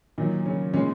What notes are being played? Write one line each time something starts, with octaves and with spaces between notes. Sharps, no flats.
A#2 D#3 F#3 D#4
C#3 C#4
A#2 C#3 G#3 C#4